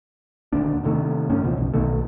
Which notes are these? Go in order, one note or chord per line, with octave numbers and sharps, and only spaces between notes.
D#1 D2 D4
C3 D#3 A3
D2 G2 C#4
C#2 B2 E3 F3
B1 F#2
B1 B2 D#3 A3